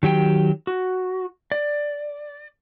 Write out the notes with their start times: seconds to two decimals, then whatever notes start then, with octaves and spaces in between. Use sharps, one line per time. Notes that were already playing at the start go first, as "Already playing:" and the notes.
0.03 D#3 F#3 G4 G5
0.67 F#4
1.52 D5